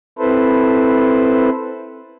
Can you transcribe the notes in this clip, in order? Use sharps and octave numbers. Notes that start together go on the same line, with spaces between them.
C4 E4 A4 B4 C5